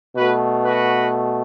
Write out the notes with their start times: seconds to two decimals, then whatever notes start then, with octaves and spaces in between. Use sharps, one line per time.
0.16 B2 A3 F#4 B4
0.64 F#4 B4